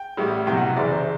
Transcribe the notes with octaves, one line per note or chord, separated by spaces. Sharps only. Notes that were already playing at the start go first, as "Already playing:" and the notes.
Already playing: G5
A1 A2 G3
C2 B2 F#3 G5
F#5
E5
F#1 F#2 E3 D5
C5